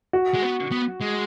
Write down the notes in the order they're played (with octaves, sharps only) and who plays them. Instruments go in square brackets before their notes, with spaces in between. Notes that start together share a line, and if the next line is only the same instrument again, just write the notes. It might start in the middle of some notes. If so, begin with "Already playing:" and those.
[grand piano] F#4
[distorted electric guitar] G#3
B3
B3
G#3